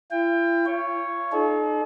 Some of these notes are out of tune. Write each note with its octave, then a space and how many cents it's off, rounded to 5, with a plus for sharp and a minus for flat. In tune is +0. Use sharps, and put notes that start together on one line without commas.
E4 +45 G5 +25
F4 -30 C#5 +0
D#4 -35 A4 -45